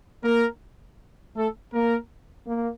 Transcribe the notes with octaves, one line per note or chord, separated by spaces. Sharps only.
A#3 A#4
A3 A4
A#3 A#4
A#3